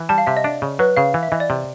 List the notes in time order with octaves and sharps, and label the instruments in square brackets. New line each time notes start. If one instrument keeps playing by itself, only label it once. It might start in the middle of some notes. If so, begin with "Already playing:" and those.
Already playing: [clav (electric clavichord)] E3
[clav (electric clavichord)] G3 [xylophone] A5
[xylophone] F5
[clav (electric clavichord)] C3 [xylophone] E5
[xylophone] D#5
[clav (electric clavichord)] D4 [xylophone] D5
[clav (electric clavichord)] C#3
[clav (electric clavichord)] F#3 [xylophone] B4
[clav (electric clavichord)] C#3 [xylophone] F5
[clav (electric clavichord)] E3
[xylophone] E5
[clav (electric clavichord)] E3 [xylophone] D#5
[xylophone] D5
[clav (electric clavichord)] C3